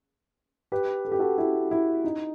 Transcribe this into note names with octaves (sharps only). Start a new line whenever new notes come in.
G4 B4
A4
G4
F#4 A4
E4 G4
E4
D#4